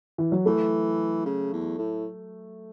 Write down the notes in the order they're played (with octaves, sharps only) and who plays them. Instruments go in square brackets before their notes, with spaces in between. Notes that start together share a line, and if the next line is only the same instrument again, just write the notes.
[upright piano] E3
F#3
[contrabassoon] E3 [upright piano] A3
[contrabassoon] C#3
E2
A2